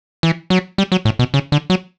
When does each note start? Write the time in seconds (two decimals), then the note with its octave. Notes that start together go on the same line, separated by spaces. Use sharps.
0.23 E3
0.50 F#3
0.78 G3
0.92 F#3
1.05 A2
1.19 B2
1.34 C#3
1.52 D3
1.70 F#3